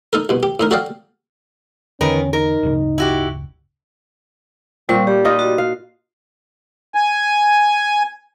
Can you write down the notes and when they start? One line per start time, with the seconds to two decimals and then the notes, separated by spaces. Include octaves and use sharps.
0.13 D#4 A4 A#4
0.29 C2 B2
0.43 G4
0.60 A2 D#4 A#4
0.71 F#4 A4 D5 D#5 F5 G5
2.01 E2 D3 D#3 C#4 A#4 B4
2.33 D#4 A#4
2.63 D1 G1 C#3
2.98 E4 F#4 G4
4.89 A#2 G3 C4 C#6
5.07 G3 G4
5.24 D#4 F4 D#5
5.39 F#4
5.58 F5
6.95 G#5